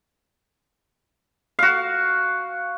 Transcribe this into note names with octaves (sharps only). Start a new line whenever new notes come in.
F#4 F5